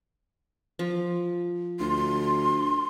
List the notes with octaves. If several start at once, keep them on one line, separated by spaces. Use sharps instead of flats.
F3
D2 C6